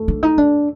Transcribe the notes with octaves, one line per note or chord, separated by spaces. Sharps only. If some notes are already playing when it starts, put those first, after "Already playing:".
Already playing: A3
D4
D#4
D4